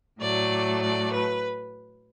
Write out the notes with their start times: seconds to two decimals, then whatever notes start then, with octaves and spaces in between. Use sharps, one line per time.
0.20 A2 F#3 A3 D5
0.82 D5
1.13 B4